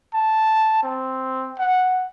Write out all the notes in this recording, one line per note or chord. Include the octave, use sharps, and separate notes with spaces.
A5
C4
F#5